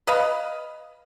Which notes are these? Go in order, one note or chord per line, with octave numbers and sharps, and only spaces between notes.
B4 D#5 F5 B5